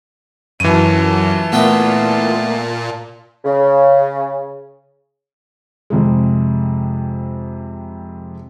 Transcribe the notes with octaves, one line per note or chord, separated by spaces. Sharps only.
F#2 E3 F4 A5 D#7
A#2 A3 B3 G5
C#3
F2 C3 G#3